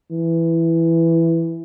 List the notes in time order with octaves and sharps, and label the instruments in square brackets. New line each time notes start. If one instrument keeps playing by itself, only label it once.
[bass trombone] E3